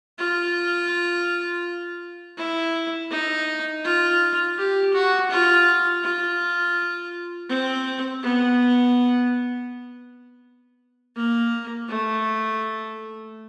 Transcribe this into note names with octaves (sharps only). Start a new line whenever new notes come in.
F4
E4
D#4
F4
G4
F#4
F4
F4
C4
B3
A#3
A3